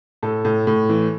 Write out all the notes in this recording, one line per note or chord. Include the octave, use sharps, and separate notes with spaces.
A2 A4
A2
A2
E3